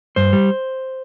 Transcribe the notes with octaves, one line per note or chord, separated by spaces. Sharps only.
G2 C5
G3